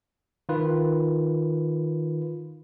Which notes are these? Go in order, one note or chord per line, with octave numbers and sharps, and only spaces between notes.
D#3 F4 B4